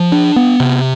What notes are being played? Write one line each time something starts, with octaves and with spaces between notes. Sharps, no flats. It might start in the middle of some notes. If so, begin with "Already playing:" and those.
Already playing: F3
D4
B3
C3